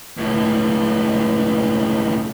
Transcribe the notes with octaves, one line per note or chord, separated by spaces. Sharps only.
C#2 A2